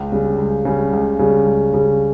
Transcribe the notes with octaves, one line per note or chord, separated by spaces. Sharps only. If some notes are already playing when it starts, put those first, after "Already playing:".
Already playing: C#2
C#3 G3
C#2
C#3 G3
C#2
C#3 G3
C#2
C#3 G3